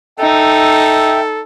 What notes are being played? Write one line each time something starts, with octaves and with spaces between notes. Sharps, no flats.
D#4 A4 E5 G5